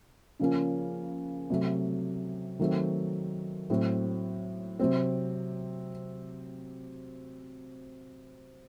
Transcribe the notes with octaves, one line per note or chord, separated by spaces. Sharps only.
C#3 F3 A#3 C#4
C3 F#3 A3
D#3 F#3 A3 C4
A2 F#3 C4
C3 F#3 C4